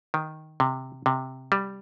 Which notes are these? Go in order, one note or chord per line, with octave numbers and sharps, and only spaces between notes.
D#3
C3
C3
G3